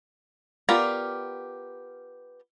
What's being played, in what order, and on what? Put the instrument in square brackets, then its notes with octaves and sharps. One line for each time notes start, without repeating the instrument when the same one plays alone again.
[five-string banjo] B3 F4 G4 A#4 D5